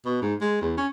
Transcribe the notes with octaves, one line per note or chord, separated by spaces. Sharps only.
B2
G#2
G#3
E2
C#4